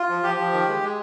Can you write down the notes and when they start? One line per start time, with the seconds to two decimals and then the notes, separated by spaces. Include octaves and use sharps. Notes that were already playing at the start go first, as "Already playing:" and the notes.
Already playing: F4
0.09 F3
0.23 F3 G4
0.39 F3
0.52 D#3
0.68 G#3
0.83 G#3